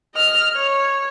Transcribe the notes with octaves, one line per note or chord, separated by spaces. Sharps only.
D#5 F6
C#5